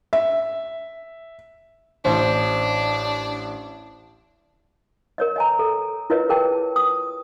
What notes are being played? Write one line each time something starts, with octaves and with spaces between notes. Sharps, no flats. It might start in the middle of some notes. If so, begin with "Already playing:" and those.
E5
A1 D4 C5
A#4 C#5 D#5
D#5 G#5 A#5
A4
E4 F4 A#4 B4 C#5 D#5
G#4 A#4 G5 A5
D#6